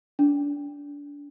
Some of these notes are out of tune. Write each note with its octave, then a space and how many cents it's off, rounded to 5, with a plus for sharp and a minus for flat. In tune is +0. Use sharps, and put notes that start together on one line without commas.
D4 -25